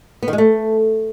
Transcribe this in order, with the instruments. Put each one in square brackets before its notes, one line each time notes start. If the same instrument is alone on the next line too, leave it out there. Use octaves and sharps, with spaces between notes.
[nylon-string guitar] B3
D#3
G#3
A3